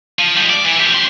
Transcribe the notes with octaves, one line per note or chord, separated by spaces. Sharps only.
F3
G3 G#3
D5
E3
F3 G4
F#2 C6